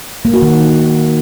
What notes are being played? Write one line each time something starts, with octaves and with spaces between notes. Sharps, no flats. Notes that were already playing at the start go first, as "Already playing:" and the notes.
A#3
F#4
D#3